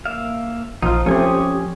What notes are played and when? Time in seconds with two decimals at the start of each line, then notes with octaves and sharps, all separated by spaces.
0.06 A#3 E5 F5
0.83 A#1 F3 D#4 F4
1.06 F3 A3 C4 C#4 G4 G#5 D#6